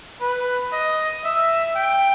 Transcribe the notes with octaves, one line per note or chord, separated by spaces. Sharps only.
B4
D#5
E5
G5